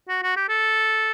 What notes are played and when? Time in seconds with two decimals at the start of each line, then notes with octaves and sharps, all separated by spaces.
0.09 F#4
0.23 F#4
0.36 G4
0.49 A4